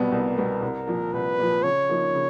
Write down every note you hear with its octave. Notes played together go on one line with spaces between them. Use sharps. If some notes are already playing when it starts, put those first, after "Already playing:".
Already playing: C2 B2 G3 B3
C2 A#4
B2 G3 B3
C2
A#2 F3
C2 B4
A#2 F3
C#3 C#5
F3 A#3 D#4
C#3